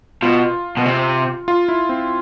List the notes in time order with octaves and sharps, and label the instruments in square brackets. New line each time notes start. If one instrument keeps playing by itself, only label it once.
[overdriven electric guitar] B2 [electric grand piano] F4
[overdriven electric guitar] B2
C3
[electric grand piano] F4
E4
C4